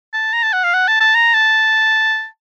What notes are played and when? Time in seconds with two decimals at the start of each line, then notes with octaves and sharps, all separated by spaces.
0.14 A5
0.33 A#5
0.43 A5
0.53 F#5
0.64 F5
0.74 F#5
0.88 A5
1.00 A5
1.15 A#5
1.34 A5